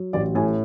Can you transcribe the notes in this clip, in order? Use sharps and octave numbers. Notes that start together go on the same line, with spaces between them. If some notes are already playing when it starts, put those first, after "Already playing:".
Already playing: F#3
A1 D5
A2 G#5